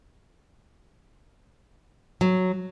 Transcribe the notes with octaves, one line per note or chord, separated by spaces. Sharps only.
F#3